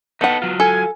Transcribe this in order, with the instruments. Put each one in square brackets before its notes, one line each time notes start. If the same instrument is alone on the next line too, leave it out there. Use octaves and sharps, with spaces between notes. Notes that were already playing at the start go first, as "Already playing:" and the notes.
[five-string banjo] B3 F#5 [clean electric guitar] D#4 A4 B4
[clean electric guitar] F#3 F4
[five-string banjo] A4 [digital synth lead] G#5